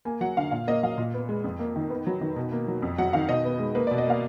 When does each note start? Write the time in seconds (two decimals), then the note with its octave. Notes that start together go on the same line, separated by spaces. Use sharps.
0.05 A#3 G#5
0.21 F#3 F#5
0.37 D3 F5
0.51 A#2 F5
0.67 A#3 D#5
0.83 F#3 F5
0.98 A#2
1.14 B3
1.29 G#3
1.44 F2
1.59 A#3
1.76 D#3
1.90 B3
2.07 F#3
2.21 D#3
2.36 B2
2.52 A#3
2.68 F#3
2.82 F2
2.98 F#3 F#5
3.13 D#3 F5
3.29 B2 D#5
3.45 B3
3.59 G#3
3.75 A#3 B4
3.87 B2 D5
3.98 D#5
4.07 A#3 F5